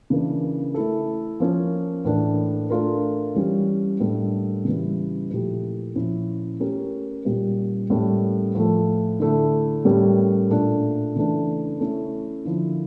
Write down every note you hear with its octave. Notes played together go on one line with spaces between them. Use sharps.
C#3 E3 A#3 D4
A3 E4 A4
F3 A#3 C#4
A2 E3 A#3 D4
A3 D4 F4 A#4
E3 G3 C#4
A2 G3 A#3 D4 A4
C#3 E3 G3
A#2 F3 A3 E4 G4
A#2 F3 C#4 E4
A3 C#4 G4 A#4
A#2 G3 A#3 C#4 G4
A2 G3 A#3 C#4
A2 F3 A3
D3 A3 E4
A2 G3 C#4 G4 A#4
A#2 A3 D4
C#3 E3 A3 D4
A3 C#4 E4
D3 F3 A#3 E4